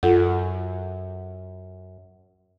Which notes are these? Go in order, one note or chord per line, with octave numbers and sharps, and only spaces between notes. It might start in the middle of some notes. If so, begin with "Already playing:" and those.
F#2 F4 A4 F#5